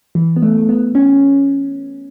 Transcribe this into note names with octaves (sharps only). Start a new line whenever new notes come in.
E3
B3
A3
A3
B3
C#4